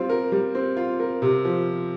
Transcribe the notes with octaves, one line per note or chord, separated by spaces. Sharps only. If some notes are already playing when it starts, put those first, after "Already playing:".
Already playing: G3 C4 F4
A#4
G3
C4
F4
A#4
C3
F3